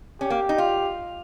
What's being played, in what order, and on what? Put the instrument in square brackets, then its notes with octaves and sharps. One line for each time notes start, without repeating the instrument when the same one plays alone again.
[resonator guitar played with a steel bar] C#4 [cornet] G4
[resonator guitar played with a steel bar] A#3
D#4
F4